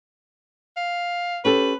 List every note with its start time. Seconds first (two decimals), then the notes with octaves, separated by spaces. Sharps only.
0.77 F5
1.45 C#4 G4 A4 B4